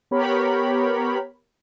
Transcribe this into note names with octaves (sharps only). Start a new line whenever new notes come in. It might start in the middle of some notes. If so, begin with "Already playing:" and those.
B3 G4 A#4 C#5 B5